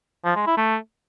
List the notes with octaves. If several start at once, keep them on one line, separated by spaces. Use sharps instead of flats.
F3
G#3
E4
A3